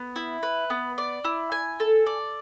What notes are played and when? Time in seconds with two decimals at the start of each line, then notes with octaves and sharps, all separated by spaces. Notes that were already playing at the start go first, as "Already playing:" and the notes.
Already playing: B3
0.16 E4
0.43 B4
0.70 B3
0.98 D5
1.25 E4
1.52 G#5
1.80 A4
2.06 D5